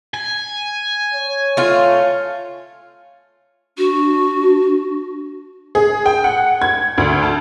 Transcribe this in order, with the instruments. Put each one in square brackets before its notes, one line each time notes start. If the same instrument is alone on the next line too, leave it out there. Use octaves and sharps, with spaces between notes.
[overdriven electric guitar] G#5
[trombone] C#5
[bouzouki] A3 F4
[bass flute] D4 [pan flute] F#4
[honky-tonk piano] G#4
G5
F#5
G#6
D2
A5